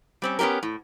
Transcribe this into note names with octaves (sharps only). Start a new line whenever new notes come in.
G3 C4 C#4
B3 C#4 D4 G4 A#4
A2